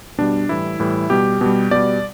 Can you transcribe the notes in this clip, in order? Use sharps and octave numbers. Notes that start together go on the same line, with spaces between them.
B2 G3 D4
A2 E3 G3 E4
A2 E3 G3
B2 G3 G4
B2 G3
B2 G3 D5